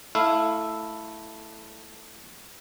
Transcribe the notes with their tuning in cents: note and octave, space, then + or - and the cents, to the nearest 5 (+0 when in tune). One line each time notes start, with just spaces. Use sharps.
A3 +0 E4 +0 F5 -15